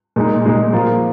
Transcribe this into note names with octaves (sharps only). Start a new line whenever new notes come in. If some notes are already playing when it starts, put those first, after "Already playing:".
A#2 G#3 D#4
A#2 G#3 D#4
F3 A#3 F4